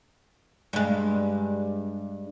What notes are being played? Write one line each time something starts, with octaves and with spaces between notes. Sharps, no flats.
G2 G#3